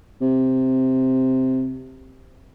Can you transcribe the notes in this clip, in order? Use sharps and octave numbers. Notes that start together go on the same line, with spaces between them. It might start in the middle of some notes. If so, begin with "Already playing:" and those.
C3